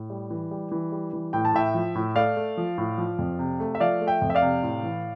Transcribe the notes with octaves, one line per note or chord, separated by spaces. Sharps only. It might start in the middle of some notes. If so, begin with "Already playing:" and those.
Already playing: A2
G3
E3
G3
E3
G3
E3
A2 G5
A5
A2 E5 G5
F3
A2
A3 D5 F5
A3
F3
A2
F3
F2
C3
A3
E5
F3 D5 F5
A3
E5 G5
F2
E5
D5 F5
C3
A2
E3